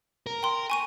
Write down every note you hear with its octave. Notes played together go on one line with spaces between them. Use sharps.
A#4
G5 C6
G#5 C#6 D#7